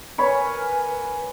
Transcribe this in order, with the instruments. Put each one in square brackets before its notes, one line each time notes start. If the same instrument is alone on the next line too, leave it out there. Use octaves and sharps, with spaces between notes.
[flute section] A#4 B4 G#5 [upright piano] C#5 B5 C#6